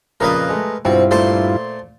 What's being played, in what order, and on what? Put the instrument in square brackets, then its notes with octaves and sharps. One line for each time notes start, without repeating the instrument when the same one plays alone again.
[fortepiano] F2 A#2 C#3 [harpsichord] A#4 B4 D#5
[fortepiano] G#3 A3
[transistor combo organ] G2 E4 F4 [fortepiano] B2 [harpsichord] C4
[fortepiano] A#2 A3 [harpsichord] C5 A5 C6